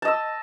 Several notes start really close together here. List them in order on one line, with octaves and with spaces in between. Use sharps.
A5 D#5 E6